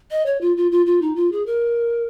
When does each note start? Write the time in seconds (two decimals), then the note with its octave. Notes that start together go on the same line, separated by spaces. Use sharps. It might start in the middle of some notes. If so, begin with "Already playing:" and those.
0.11 D#5
0.26 C#5
0.41 F4
0.57 F4
0.71 F4
0.86 F4
1.02 D#4
1.16 F4
1.32 G#4
1.46 A#4